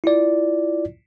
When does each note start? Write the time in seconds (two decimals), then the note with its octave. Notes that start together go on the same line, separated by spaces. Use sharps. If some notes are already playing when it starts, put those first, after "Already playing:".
0.04 E4 F4 D5